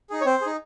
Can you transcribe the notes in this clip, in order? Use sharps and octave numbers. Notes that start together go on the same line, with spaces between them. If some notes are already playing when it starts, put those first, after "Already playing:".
D#4 G#4
C#5
C4 C5
G#4
D#4